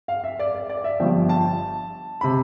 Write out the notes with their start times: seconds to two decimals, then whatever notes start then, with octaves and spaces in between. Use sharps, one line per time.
0.08 F5
0.24 E5
0.39 D5
0.54 D5
0.69 D5
0.84 E5
1.00 G1 G2 F3 G5
1.29 A5
2.21 C3 B5